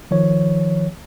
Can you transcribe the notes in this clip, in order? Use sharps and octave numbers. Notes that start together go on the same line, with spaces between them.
D#3 F3 C#5